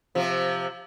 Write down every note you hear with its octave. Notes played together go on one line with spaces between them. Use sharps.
C3 F3